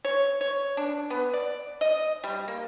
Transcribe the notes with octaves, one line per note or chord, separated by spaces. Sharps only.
C#5
C#5
D4
B3
D5
D#5
G3
A#3